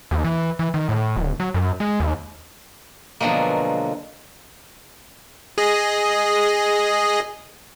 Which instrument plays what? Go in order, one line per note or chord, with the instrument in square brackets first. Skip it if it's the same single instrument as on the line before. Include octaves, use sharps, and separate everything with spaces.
[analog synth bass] D#2
E3
E3
D#3
A2
D1
F#3
F#2
G#3
D#2
[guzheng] B2 D3 F3 F#3 G#3 A#3
[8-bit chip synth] G#4 D#5